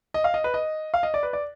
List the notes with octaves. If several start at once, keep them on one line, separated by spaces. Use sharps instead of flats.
D#5
F5
D#5
B4
D#5
F5
D#5
D5
B4
D5